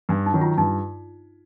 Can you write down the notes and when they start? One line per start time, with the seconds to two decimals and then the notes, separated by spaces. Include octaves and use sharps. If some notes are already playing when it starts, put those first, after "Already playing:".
0.09 G2 D4
0.26 D#4
0.33 D#3 F#3
0.41 F4
0.58 G2 D#4